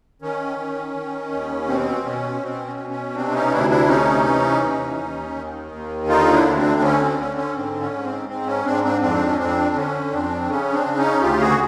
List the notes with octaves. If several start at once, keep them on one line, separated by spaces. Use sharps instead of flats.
D#3 C#4
D#3
D#3
D#2
B2 C4
B2 C#4
B2 C4
C#4
B2
C#4
C3 C4 D4
C#4 D#4
D2 D4 E4
D4 E4
C3 C#4 D#4
E3
D#2
D#2
D#3
D#2
D3 D#4 F4
D4 E4
D2
C4 D4
D3 C#4
C4
D3 C#4
C#4
G#2 C4
C#4
G#2
C4
G#2 C4
C#4
G#2 C4 D4
C4 D4
F2 C4 D4
C#4
F2 C4 D4
D3 C#4
F2 C4 D4
C#3 C#4
C4 D4
C#3
C#4 D#4
D2 F4 G4
F#4 G#4